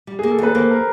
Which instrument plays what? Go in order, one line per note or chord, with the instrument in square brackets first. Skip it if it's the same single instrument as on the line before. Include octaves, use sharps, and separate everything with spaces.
[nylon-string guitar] G3
[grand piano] G#4
[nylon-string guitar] A#3
[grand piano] A4
[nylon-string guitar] D#2 [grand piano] B4
[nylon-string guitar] A#3 [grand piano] C5
[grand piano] A#4